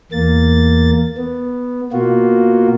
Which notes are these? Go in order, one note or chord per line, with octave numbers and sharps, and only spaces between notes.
E2 A#3 A6
B3
B2 A#3 F4 F#4